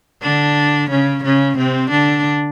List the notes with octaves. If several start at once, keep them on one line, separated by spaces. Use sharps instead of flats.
D3 D4
C#3 C#4
C#3 C#4
C3 C4
D3 D4